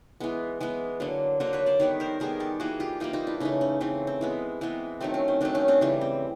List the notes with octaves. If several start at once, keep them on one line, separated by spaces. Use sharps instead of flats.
E3 G#3 B3
E3 G#3 B3
D3 F#3 A#3
D3 F#3 A#3 A#4 C5
B4 C#5
C5 D5
D#3 G3 B3 B4 C#5
A#4 C5
D#3 G3 B3 G#4 A#4
G4 A4
E3 G3 A#3 F#4 G#4
F4 G4
E3 G3 A#3 D#4 F4
D#4 F4
D4 E4
C#3 E3 A3 C#4 D#4
C#4
C#3 E3 A3 C4
C4
E3 G#3 B3
E3 G#3 B3 C4
D#3 F#3 A3 C4
C#4
C4
D#3 F#3 A3 C4 D4
C#4 D#4
C4 D4
C#3 E3 G3
C4